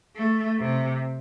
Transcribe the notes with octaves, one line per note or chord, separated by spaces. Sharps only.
A3
C3